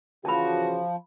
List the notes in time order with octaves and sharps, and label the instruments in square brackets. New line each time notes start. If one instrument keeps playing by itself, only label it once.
[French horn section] C#3 E3 F#4 [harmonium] F3 [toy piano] A5 B5